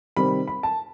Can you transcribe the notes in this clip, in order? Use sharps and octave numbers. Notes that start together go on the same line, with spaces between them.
C3 D#3 G3 C4 B5
B5
A5